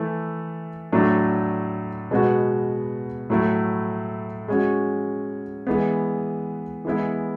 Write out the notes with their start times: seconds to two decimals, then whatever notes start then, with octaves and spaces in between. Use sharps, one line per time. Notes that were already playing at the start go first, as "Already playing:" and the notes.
Already playing: E3 A3 E4 A4
0.92 A2 F#3 A3 D4
2.11 B2 G#3 B3 F#4
3.30 A2 F#3 A3 E4
4.48 G#3 C#4 F#4
5.67 E3 G#3 B3
6.85 E3 G#3 B3 E4